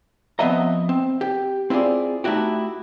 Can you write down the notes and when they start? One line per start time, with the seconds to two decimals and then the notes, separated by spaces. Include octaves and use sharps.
0.39 F3 B3 C4 D#5 E5 A#5
0.89 C4
1.21 G4
1.70 C4 E4 F4 G#4 D5
2.24 A3 D#4 E4 F#4 G4